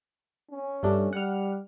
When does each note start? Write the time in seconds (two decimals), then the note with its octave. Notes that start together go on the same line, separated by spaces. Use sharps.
0.51 C#4
0.83 G2 A3 D4
1.13 G3 F#5 F6